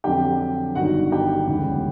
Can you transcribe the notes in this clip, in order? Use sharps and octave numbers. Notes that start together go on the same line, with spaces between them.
F2 D3 F#3 G4 G5
G1 G2 D#3 F#4 F#5
G4 G5
E1 D2 C#3 E3